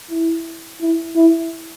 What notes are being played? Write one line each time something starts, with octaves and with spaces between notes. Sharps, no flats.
E4
E4
E4